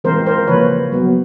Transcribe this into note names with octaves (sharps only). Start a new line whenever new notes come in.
E3 G#3 C4 A#4 C5
A#4 C5
C#3 F3 A#3 B4 C#5
F#3 B3